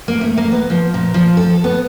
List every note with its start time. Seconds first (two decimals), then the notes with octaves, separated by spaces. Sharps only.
0.08 A#3
0.21 A3
0.37 A#3
0.52 B3
0.70 F3
0.94 A#2
1.14 F3
1.37 A4
1.64 B3